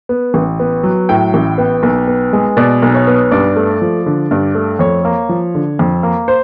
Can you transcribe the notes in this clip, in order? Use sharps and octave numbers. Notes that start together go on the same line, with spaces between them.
B3
A1
B3
F#3
A2 G5
A1
B3
B1
B3
G#3
B2 D5
B1
C#5
B3
G2 D5
A3
F3
D3
G2
A3
F2 C#5
A#3
F3
D3
F2
A#3
C5